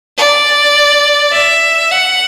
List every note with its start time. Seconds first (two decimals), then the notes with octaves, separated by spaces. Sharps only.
0.18 D5
1.33 E5
1.92 F#5